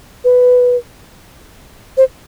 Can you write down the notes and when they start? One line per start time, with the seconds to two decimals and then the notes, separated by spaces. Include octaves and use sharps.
0.24 B4
1.97 C5